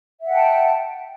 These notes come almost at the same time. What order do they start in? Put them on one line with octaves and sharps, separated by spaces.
E5 F#5 G5 A5